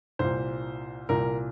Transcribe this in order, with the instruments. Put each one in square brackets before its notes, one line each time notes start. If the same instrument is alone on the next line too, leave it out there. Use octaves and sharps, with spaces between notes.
[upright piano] C2 A#2 C5
C2 A#2 A#4